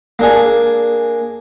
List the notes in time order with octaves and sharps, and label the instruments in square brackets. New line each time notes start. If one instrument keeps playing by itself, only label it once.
[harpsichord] A#3 D4 G#4